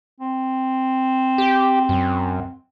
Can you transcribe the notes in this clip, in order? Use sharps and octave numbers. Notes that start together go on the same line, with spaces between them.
C4
G4
F#2